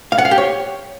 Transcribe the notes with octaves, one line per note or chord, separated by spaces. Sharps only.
F5
F#5
F5
G4
C#5